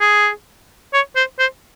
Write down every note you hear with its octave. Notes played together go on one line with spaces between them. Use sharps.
G#4
C#5
C5
C5